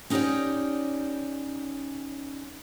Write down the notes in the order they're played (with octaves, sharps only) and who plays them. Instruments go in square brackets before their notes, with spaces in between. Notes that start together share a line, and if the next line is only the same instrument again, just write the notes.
[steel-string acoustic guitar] C#4 D#4 G4 B4 C#5 D5